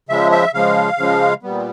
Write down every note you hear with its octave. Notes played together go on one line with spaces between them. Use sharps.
C#3 F3 G#3 E5
E5
C#3 F3 G#3 F5
C#3 F3 G#3
A#2 G3 B3